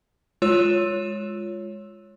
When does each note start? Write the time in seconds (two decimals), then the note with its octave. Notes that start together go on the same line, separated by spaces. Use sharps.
0.42 G#3 F4 C#5 E6 E7